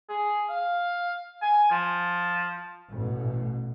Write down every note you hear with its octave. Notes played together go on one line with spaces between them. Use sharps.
G#4
F5
G#5
F3
A1 B2